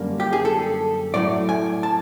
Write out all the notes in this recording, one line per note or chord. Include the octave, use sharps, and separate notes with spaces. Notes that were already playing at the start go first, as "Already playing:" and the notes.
Already playing: F#2 D3 G3 A#3
G4
G#4
A4
A2 F#3 A3 D5
G#5
A5